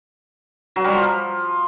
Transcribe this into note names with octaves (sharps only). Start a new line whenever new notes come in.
F#3
G3
F3